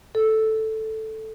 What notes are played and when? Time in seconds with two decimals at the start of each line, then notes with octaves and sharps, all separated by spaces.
0.15 A4